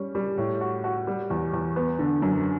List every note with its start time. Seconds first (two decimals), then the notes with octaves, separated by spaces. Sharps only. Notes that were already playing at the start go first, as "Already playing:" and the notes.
Already playing: G3 C#4
0.15 G3
0.38 A2
0.61 F#4
0.84 F#4
1.07 G3
1.30 E2
1.53 E2
1.76 B3
1.99 D3
2.22 F#2